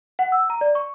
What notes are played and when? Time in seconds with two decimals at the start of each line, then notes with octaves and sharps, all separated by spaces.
0.19 F#5
0.32 E6
0.50 A#5
0.61 D5
0.75 C#6